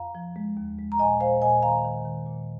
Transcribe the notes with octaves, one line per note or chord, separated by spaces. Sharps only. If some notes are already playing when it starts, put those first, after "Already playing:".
Already playing: F2 F5 A#5
F3
G#3
D#2
G#3
A#5
A#2 D#5 G#5
A#2 C5 F5
A#2 D#5 G#5
D#3 F5 A#5
D#3
D#3
A#2